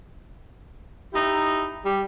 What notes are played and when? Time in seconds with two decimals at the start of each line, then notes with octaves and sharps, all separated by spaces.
1.14 D#4 E4 G4
1.84 G3 G4